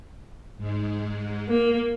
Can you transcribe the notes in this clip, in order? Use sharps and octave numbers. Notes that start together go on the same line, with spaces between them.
G#2 G#3
A#3